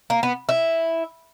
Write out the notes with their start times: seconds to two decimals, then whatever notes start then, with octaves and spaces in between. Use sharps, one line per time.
0.10 A#3
0.23 B3
0.49 E4